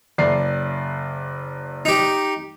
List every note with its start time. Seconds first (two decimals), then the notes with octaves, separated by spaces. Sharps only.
0.18 F#1 D5 C7
1.85 D#4 G4